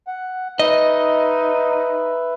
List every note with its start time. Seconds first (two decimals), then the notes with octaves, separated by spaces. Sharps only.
0.07 F#5
0.59 D#4 B4 D#5 E5